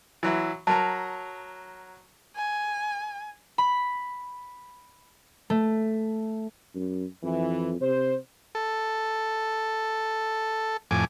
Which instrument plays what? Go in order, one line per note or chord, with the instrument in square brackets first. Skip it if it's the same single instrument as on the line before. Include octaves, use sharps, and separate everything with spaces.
[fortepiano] E3 F#3 E4
[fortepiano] F#3 A#4 A#5 [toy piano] A5
[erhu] G#5
[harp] B5
A3
[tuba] F#2
[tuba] F2 [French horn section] E3
[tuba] C3 [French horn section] C5
[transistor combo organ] A4
F2 A2 G#5 D6